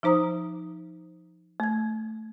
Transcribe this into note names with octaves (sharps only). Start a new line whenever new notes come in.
F3 D#4 C5 A#5 D#6
A3 G#6